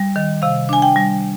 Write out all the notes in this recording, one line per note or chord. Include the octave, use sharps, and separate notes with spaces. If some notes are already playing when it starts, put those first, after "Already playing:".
Already playing: G3
D#3
C3 F5
D4 G#5
G5
G3